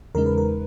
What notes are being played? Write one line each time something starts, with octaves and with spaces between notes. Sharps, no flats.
E2 C#3 G#3 D#4 A#4
B4
A#4